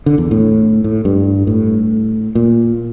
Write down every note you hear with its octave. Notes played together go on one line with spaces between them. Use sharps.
D3
E2
A2
A2
G2
A2
A#2